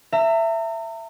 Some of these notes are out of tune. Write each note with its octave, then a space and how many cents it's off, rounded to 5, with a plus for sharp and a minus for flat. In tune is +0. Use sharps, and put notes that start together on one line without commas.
E5 +15 A#5 -40